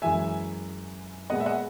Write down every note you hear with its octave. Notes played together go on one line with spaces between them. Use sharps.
F#2 E3 G#3 E5 G#5
A#2 G#3 B3 D#5 F#5
E5
D#5 F#5